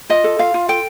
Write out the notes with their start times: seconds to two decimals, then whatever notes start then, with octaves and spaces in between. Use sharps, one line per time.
0.09 F4 D#5
0.24 A4
0.39 F4 F5
0.54 F4
0.68 A4 G5